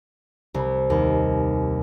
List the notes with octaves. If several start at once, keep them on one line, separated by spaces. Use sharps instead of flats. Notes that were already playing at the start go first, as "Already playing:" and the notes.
C2
D#2